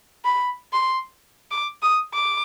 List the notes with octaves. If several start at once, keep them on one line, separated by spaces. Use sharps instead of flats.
B5
C6
D6
D#6
D6